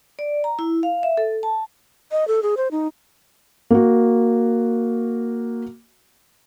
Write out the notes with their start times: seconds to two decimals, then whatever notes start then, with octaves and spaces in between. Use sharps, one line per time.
0.19 D5
0.44 A#5
0.59 E4
0.83 F5
1.03 E5
1.17 A4
1.43 A5
2.11 D#5
2.28 A4
2.43 G#4
2.57 C5
2.71 D#4
3.70 A#3 F#4